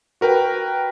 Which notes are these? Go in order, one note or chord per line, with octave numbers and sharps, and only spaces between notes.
F#4 A#4 B4 G5